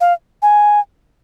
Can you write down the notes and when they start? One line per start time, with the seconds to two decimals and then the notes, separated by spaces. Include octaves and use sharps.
0.01 F5
0.42 G#5